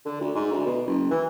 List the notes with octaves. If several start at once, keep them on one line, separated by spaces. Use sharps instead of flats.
D3
D2
G#2
D2
B2
F#1
E3